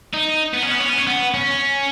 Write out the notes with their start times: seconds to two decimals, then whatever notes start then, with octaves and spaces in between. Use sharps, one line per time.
0.14 D#4
0.54 B3
0.63 C#4
0.71 B3
0.80 C#4
0.90 B3
0.98 C#4
1.07 B3
1.34 C#4